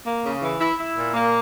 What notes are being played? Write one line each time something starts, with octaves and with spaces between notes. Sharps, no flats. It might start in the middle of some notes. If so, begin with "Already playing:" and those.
A#3
C#3
E3
E4
E4
A#2
A#3